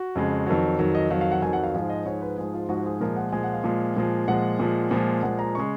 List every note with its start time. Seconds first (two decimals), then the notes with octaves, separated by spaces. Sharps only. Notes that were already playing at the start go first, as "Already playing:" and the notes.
Already playing: F#4
0.15 F2 C#3 G#3
0.47 F2 D#3 F#3
0.79 F2 D#3 F#3
0.95 D#5
1.10 F2 D#3 F#3 F5
1.21 F5
1.32 F#5
1.42 F2 D#3 F#3 G#5
1.53 F#5
1.64 F5
1.74 G#2 F3 G#3 F5
1.90 D#5
2.05 G#2 F3 G#3 C#5
2.22 B4
2.38 G#2 F3 G#3 G#4
2.54 F4
2.69 G#2 F3 G#3 F#4
2.86 G#4
3.01 A#2 F3 G#3 A#4
3.16 F#5
3.32 A#2 F3 G#3 G#5
3.44 F#5
3.53 F5
3.64 A#2 F3 G#3
3.96 A#2 F3 G#3
4.28 A#2 F3 G#3 F#5
4.59 A#2 F3 G#3
4.91 A#2 F3 G#3
5.23 A#2 F3 G#3 F#5
5.39 A#5
5.55 C#3 G#3 C#6